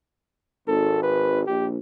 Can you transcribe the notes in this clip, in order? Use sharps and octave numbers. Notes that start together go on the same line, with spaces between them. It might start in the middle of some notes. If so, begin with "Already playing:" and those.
G#1 A4
B4
A#1 G4